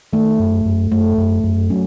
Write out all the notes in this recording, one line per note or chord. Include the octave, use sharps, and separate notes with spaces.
D#3 A3
F#2
F#2
F#2 A3
F#2
F#2
F#3 C#4